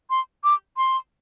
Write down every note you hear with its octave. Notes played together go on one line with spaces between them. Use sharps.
C6
D6
C6